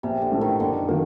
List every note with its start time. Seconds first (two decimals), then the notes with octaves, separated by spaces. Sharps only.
0.03 A#1 C3
0.22 D3
0.32 A2 A3
0.41 D#3
0.60 F#1 D3
0.88 D3 D#3 F#3 A#3